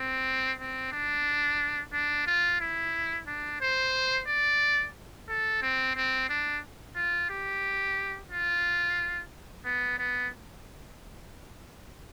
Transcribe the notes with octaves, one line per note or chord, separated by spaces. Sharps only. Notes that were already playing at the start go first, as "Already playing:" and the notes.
Already playing: C4
C4
D4
D4
F4
E4
D4
C5
D5
A4
C4
C4
D4
F4
G4
F4
B3
B3